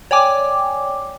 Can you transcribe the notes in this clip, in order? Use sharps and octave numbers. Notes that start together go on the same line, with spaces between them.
C#5 D5 G5 G#5 D6